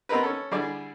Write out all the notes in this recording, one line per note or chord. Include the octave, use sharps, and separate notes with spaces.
B3 C4 D#4 A#4 B4
C#4 A4
D3 G3 E4 G#4 D5